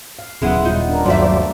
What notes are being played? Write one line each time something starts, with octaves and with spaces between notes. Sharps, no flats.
F5
D#1 C#3 F#3 G#3 B3 E4 F#5
D#1 G3 D#4 F4
D4 A#4
G1 D#2 F3 F#3 A3 C5 D5 E5